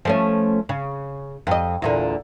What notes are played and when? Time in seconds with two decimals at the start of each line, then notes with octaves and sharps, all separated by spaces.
0.05 F3 A3 C#4
0.69 C#3
1.47 F2 D#5
1.82 E2 A#2 D3